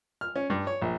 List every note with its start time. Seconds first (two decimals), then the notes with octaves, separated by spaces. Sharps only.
0.21 F6
0.36 C#4
0.50 G2
0.67 C#5
0.82 A#1